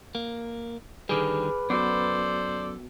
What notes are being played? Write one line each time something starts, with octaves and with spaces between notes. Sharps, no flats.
A#3
D3 D#3 G3 G#4 B4 D6 F6
F#2 B3 F#4 A4 C5 D5